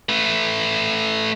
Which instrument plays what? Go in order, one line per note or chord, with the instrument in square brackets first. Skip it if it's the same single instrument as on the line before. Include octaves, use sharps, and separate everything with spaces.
[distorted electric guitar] A3 B4